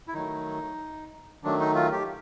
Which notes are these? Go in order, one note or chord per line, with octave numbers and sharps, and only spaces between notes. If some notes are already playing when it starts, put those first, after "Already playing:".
E4
D#3 F#3 A3 D#4
D#3 F#3 A3 D4
D#4
F4
G4